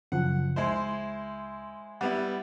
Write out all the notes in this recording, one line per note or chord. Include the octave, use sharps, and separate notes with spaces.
F#2 C#3 F3 F#5
C#2 G#3 E4 C5
G3 B3 E4 F#5